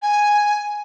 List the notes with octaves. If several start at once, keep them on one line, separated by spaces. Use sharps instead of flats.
G#5